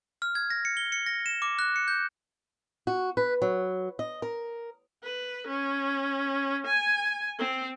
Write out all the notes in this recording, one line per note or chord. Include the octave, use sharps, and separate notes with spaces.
F6
G#6
A#6
C#7
G7
C#7
A#6
E7
D6
F#6
C#7
G6
F#4
B4
F#3
D#5
A#4
B4
C#4
G#5
C4